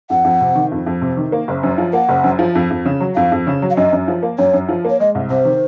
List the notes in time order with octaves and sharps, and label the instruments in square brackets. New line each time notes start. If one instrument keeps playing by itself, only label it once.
[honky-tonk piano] F2 [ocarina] F#5
[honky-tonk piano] F2
C3
D#3
F2
F2
C3
D#3
A#3
F#1
F#2
F3
[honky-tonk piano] A#3 [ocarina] F#5
[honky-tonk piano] F#1
F#2
F3
F2
F2
C#3
F#3
[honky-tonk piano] F2 [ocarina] F5
[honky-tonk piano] F2
C#3
F#3
[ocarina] F5
[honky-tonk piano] F#2 [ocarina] D#5
[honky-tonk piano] F#2
F3
A#3
[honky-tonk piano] F#2 [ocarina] C#5
[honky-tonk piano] F#2
F3
A#3
[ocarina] C#5
[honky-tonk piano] G#3 [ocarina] D#5
[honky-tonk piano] C2
[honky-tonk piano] C3 [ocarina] C5
[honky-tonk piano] D#3